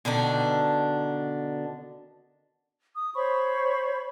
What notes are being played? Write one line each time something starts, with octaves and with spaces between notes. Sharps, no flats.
B2 D3 D#3 D4
D#6
C5 C#5 B5 C#6